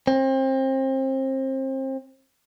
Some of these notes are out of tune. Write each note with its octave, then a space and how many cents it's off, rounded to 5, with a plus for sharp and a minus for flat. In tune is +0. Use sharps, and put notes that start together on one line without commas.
C4 +30